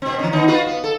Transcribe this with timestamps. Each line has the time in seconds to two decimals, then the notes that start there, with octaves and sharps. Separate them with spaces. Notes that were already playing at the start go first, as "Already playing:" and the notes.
0.02 B2 C4
0.19 E3 C#4
0.33 D#3 B3 D#4
0.48 F4 F#4 B4
0.67 B3
0.84 A4